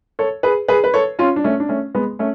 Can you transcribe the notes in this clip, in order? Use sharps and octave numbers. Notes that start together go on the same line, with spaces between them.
A4 C#5
G#4 B4
G#4 B4
B4
A4 C#5
C#4 F4
D4
A3 C#4
D4
A3 C#4
G#3 B3
A3 C#4